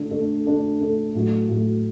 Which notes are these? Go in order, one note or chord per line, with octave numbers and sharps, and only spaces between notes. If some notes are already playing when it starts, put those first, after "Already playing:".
Already playing: D3 A3 D4 A4
D3 A3 D4 A4
D3 A3 D4 A4
D3 A3 D4 A4
A2 F#3 A3
A2 F#3 A3